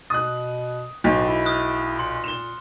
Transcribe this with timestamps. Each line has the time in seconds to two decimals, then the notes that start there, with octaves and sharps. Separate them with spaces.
0.10 B2 D#6 F#6 A6
1.04 B1 A2
1.27 E4
1.46 D#6 F6 F#6
1.99 A#2 C6 C#7
2.24 E7 G7